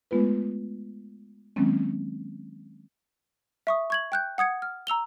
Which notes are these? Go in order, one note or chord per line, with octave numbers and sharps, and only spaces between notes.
G#3 A3 B3 F4 B4
D#3 F#3 G#3 A#3 C4 C#4
E5 C#6 D#6
C#6 G#6 F#7
G5 F#6 G6
F#5 D#6 G#6 C#7
F6
A#5 E6 F7 G7